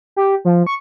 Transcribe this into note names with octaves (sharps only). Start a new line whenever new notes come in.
G4
F3
C#6